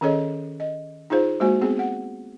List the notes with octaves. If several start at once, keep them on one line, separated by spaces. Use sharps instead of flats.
D#3 C#4 G#4 A4 C#5 D#5
D#5
D#4 F4 G#4 C5
G#3 A#3 F#4 C5 G#5
B3 C4 G#4
F#5